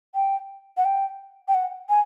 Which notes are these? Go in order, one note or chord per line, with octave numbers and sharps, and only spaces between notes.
G5
F#5
G5
G5
F#5
G#5